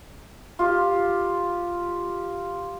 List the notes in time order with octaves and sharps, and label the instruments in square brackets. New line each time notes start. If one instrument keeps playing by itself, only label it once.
[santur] F4 G4